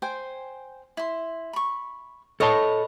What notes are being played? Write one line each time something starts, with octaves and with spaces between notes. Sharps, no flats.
C5 G5 G#5
E4 C6
B5 C#6
A4 B4 C#5 D#5 A5 C#6